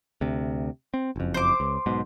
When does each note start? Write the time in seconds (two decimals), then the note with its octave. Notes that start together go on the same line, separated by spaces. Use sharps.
0.21 D2 C3
0.94 C4
1.16 F#1 F2
1.34 C5 D6
1.60 C#2
1.86 B1 G#2 B2